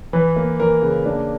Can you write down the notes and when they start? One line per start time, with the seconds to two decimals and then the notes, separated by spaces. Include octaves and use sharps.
0.13 E3 B4
0.36 A#3
0.60 E3 A#4
0.82 C#3
1.05 A#3 D4